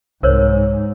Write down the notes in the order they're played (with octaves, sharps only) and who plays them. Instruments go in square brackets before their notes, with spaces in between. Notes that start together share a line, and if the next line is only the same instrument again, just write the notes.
[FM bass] C2 [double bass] G#2 [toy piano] A#4 C5 C#5